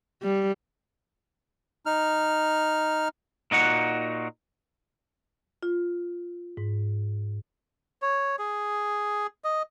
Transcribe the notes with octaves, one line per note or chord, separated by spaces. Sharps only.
G3
D#4 F6
A#2 D#4 F#4 F#5
F4
G#2
C#5
G#4
D#5